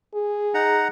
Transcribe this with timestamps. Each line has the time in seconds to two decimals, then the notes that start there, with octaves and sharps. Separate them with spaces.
0.14 G#4
0.54 D#4 F#5 A#5